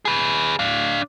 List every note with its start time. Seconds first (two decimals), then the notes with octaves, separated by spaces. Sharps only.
0.05 G#4 B4
0.59 D4 F5